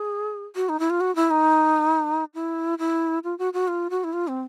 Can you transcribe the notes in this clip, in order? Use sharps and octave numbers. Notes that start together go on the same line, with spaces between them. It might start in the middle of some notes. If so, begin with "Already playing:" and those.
Already playing: G#4
F#4
D#4
E4
F4
F#4
E4
D#4
E4
E4
F4
F#4
F#4
F4
F#4
E4
F4
C4